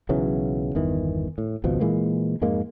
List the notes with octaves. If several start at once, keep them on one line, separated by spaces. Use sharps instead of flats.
B1 C#3 E3 F#3
G1 E2 D#3 E3
A2
G#1 C#2 B2 F3
A#2 E3 G#3 A#3
F2 G#2 G#3 A#3